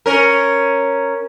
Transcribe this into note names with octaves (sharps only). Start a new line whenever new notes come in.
C#4 A#4